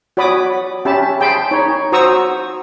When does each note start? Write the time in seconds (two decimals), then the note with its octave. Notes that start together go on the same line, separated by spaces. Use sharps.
0.17 F#4 C#5 D5 B5 D6 D#6
0.85 C#4 G4 E5 A5 B5
1.20 G#4 G5 A5 B5 C6
1.51 D#4 C#5
1.92 F#4 C5 A#5 C#6 D#6 E6